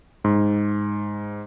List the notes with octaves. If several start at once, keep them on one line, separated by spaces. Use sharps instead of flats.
G#2